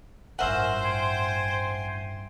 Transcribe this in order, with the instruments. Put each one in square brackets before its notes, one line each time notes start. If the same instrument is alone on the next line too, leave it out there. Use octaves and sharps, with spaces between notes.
[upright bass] A1 G2 [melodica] C#4 F4 A#4 [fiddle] C5 [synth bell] E5 F#5
[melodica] G5 G#5 C6